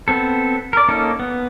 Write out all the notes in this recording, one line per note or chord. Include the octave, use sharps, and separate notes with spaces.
B3 C4 A4
A#4 D5
A#3 C#4 D#4 A4
B3